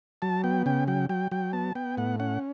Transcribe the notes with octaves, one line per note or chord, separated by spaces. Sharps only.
F#3 A5
B3 G5
C#3 G5
F#3 G5
F#3 G5
F#3 G5
B3 A5
B3 G5
A2 F#5
C#4 F#5